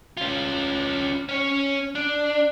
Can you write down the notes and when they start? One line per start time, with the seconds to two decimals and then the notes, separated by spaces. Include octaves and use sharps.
0.17 C#4 F4
1.29 C#4 C#5
1.95 D4